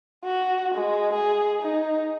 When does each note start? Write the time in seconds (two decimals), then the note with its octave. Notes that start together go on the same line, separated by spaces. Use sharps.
0.25 F#4
0.75 G#3
1.13 G#4
1.62 D#4